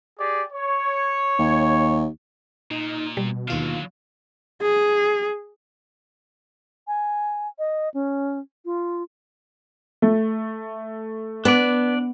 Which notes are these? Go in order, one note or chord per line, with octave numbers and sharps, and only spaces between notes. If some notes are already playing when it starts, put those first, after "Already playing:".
G4 G#4 D5
C#5
D#2
A#2 D#4
B2 G3
D#2 D3 F#3 F4 F5
G#4
G#5
D#5
C#4
F4
A3
B3 D4 D5